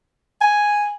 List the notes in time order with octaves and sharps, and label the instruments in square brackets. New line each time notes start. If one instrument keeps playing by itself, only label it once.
[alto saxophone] G#5